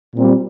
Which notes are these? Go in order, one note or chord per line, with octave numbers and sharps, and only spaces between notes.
A#2 G3 C4 F4